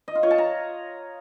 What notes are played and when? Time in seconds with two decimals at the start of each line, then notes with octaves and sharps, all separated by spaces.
0.08 D#5
0.15 F4
0.23 C#5
0.31 A5
0.38 A#5